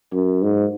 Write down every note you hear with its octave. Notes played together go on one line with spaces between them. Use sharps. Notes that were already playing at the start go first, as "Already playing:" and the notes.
F#2
G#2